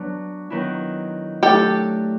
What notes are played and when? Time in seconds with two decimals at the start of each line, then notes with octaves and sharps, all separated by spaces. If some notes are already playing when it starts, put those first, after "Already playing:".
Already playing: F#3 B3 D4
0.50 D#3 F#3 B3 E4
1.43 F#3 A3 D4 G4 A4